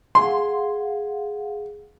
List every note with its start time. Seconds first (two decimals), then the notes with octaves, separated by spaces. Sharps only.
0.15 G#4 F5 F#5 C6